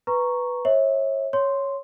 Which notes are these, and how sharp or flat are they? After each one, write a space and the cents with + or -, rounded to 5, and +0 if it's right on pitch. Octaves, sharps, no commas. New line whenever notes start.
B4 +0 A#5 +0 C#6 +0
C#5 -30 E5 -30
C#5 +0 C6 +0